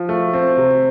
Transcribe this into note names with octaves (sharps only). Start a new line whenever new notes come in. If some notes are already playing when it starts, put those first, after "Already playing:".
Already playing: F3
A3
C4
C3